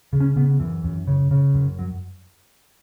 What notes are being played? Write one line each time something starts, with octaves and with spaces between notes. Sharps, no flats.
C#3
C#4
C#3 B3
F#2 E3
F#2
C#3
C#3
F#2
F#3